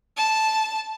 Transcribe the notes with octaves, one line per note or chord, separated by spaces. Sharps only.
A5